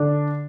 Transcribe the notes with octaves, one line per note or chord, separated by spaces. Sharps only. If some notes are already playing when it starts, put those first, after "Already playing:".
Already playing: D3 D4